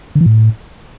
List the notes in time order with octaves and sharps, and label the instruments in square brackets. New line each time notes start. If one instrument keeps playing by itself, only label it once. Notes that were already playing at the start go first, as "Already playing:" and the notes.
[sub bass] D3
E3
A2